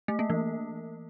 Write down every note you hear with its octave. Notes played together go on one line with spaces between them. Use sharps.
A3
A#3
E3